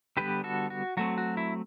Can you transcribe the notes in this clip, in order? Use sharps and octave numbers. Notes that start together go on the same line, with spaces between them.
D3 G3 B3 G4 B4
F#4 A4
F#4
F#3 A3 C4 F#4
F#4
E4